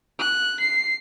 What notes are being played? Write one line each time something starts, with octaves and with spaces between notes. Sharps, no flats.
F#6
C7